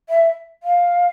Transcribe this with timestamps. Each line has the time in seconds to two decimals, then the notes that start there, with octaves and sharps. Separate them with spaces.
0.09 E5
0.63 F5